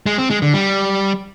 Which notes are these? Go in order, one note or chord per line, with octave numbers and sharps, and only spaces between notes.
G#3
C4
G#3
D3
G3